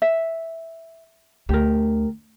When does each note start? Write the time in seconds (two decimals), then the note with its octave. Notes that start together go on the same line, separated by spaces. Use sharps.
0.02 E5
1.49 D2 G4 A#4